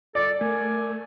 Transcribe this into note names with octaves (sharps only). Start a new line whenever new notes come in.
A4 D5
A3 A#4 G#5